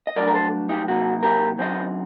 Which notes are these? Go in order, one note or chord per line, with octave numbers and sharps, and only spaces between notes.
D#5
G2 F#3 A3 D4 A#4 D5
A#4
A4 C5
D#4 G4
C3 F#3 A#3 D#4 F#4
G4 A#4
F#2 D3 F#3 C4 D#4 C5 D#5